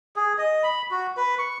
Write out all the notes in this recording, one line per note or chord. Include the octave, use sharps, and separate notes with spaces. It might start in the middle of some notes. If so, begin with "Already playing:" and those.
G#4
D#5
B5
F#4
B4
C#6